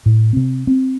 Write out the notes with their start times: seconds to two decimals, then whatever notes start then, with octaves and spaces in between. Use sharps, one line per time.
0.06 A2
0.33 C3 C4
0.67 C4